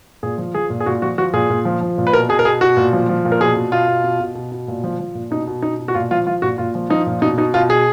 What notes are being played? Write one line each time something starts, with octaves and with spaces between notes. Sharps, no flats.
A#2 G#4
F3
F3 G#4
A#2
G#4
A#2 F#4
F3 F#4
F3 F#4
A#2 G#4
A#2
F3
F3
A#2
B4
B2 A#4
B2 G#4
A#4
B2 G#4
B2 F#4
A#2
F3
F3
A#2
A#4
B2 G#4
B2
B2 F4
B2
B2
B2
B2
B2
A#2
F3
F3
A#2
B2 D#4
B2
B2 D#4
B2
F#4
A#2 F4
F3 F4
F3 F4
A#2 F#4
A#2 F4
F3
F3 D#4
A#2
B2 D#4
B2 D#4
B2 F4
B2 G#4